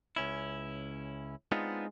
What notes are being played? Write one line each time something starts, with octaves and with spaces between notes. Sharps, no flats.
C#2 C#4 E4
G#3 B3 C4 D4 D#4 F4